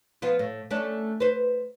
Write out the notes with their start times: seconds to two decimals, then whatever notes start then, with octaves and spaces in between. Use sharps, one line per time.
0.22 F3 B3 F4
0.39 A2
0.71 A3 C#4 D4
1.20 B4 C5